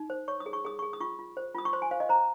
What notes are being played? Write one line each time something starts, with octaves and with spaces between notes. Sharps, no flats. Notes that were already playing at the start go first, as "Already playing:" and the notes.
Already playing: D#4
C5
C#5 C#6
D#6
G#4
C#6
G#4 D#6
G#4 C#6
D#6
F4 C#6
F4
C5
F4 D#6
C#6
C5 C6
G#5
C5 F5
D#5
C5 A#5